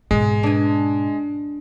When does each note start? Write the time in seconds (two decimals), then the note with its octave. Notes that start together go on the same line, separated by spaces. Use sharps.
0.11 G#2 B2 G#3
0.43 D4 G#5